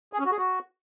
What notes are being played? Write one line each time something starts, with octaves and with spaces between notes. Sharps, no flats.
G#4
C#4
F#4
G#4
F#4